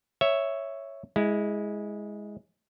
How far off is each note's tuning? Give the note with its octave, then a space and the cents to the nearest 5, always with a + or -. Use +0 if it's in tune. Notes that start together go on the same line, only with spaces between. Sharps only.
C#5 +0 E5 +0
G#3 +0 E4 -15